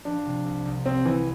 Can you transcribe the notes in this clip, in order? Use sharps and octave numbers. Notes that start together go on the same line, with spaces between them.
F3 D4
C3
C2
C2
C2 C4
C2 E3